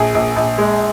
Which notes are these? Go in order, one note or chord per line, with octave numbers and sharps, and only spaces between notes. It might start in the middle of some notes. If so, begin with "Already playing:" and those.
Already playing: A#1 G#4
A#1
A#1
G#3